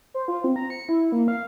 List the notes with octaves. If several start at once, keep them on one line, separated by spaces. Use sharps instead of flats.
C5
F4
C4
A#5
C#7
E4
A#3
F5